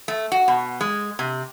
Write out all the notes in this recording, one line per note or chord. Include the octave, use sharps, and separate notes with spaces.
A3
F#4
B2
G#3
C3